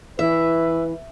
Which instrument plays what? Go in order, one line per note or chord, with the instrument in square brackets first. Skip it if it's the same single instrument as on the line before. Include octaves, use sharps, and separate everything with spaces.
[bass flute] E3 [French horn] B4 [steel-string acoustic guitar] E5